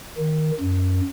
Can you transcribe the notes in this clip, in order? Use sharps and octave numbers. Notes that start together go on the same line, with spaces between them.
D#3
F#2